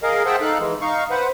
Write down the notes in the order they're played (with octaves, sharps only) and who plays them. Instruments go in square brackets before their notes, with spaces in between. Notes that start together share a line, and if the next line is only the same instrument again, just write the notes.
[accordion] G#4 A#4 D#5 F5
G#4 C5 E5 F#5 G5 A5
D#4 A4 F5 F#6
E3 G#3
D#4 F5 C#6
B4 C5 F#5